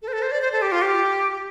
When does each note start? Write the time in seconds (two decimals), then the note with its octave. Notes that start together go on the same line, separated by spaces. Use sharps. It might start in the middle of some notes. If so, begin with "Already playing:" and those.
0.02 A4
0.08 C5
0.13 A4
0.22 C5
0.32 D5
0.42 C5
0.52 A4
0.62 G4
0.72 F4
0.82 G4